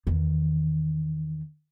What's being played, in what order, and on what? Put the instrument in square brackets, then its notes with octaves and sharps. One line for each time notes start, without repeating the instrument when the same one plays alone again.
[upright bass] E2 D#3